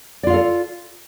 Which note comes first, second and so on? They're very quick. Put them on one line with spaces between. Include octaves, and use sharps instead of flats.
D5 F4 F5 A4